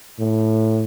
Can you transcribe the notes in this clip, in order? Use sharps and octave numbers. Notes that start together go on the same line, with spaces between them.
A2